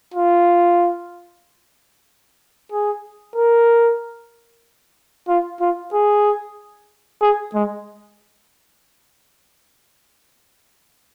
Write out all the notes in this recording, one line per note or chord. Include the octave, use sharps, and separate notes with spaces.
F4
G#4
A#4
F4
F4
G#4
G#4
G#3